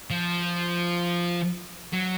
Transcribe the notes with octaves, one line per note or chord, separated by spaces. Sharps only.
F3
F#3